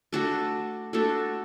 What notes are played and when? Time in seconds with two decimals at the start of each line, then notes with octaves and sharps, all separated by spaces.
0.13 A3 D4 F#4 A4
0.93 A3 D4 F#4 A4